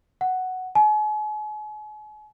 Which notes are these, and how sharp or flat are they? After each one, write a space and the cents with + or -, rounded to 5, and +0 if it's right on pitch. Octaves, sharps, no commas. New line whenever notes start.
F#5 +5
G#5 +40